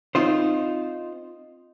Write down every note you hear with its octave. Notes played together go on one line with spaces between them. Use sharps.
C4 D#4 F4 C5